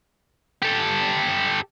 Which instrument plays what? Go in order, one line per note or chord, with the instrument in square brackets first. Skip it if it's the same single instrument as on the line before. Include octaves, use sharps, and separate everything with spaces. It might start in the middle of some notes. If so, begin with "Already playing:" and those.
[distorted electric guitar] G4 A4